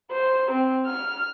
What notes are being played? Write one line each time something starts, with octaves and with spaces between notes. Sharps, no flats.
C5
C4
F6